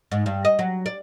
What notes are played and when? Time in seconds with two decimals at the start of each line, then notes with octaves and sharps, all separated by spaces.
0.12 G#2
0.26 G2
0.45 D#5
0.59 F#3
0.86 D5